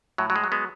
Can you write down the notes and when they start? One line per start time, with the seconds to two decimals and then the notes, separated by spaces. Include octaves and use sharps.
0.18 A2 F#3
0.30 F#3
0.36 G#3
0.44 F#3
0.52 G#3 B3